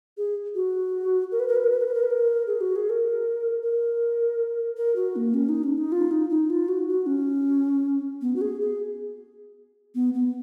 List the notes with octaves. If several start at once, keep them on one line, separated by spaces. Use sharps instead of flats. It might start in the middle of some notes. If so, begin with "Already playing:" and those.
G#4
F#4
A#4
B4
A#4
B4
A#4
B4
A#4
B4
A#4
B4
A#4
G#4
F#4
G#4
A#4
A#4
A#4
F#4
A#3
C#4
D#4
C#4
D#4
F4
D#4
D#4
F4
F#4
F#4
C#4
B3
F#4
G#4
G#4
B3
B3